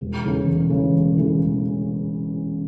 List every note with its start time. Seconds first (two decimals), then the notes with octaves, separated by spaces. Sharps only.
0.01 E1
0.24 E2 C#3 E3 A3
0.47 E1
0.70 E2 C#3 E3 A3
0.92 E1
1.16 E2 C#3 E3 A3
1.39 E1